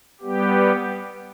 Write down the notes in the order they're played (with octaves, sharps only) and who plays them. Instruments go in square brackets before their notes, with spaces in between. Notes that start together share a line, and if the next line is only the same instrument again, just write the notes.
[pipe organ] G3 B3 G4